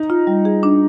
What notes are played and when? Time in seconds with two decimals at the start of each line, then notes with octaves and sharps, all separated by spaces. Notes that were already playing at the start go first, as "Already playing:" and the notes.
Already playing: D#4
0.10 F4
0.27 G3
0.45 G#4
0.63 D4